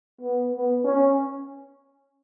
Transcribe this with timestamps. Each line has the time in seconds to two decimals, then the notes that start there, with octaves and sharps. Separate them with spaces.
0.21 B3
0.52 B3
0.84 C#4